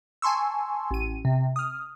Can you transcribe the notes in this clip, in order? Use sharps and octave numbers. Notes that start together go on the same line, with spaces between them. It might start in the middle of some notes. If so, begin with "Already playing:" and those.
G#5 A5 C6 C#6 E6
A1 D#7
C3
D#6 F6